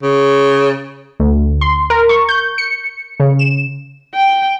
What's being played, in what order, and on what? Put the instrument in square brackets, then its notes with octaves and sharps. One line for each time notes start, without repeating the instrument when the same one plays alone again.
[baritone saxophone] C#3
[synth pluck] D2
C6
A#4
C#6
G6
C#7
C#3
E7
[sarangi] G5